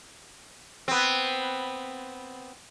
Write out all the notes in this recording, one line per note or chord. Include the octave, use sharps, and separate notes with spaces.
B3 C4